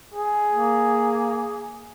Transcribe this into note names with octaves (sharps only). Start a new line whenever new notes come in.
G#4
A#3